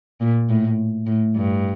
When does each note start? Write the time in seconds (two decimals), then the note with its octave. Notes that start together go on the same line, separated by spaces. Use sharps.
0.21 A#2
0.49 A2
1.06 A2
1.36 G2